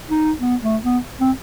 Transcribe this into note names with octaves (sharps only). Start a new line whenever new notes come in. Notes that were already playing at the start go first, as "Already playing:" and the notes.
D#4
B3
A3
B3
C4